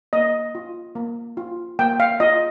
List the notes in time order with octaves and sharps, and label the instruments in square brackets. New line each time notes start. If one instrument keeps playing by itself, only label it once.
[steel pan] A#3 D#5
F4
A#3
F4
A#3 G5
F5
F4 D#5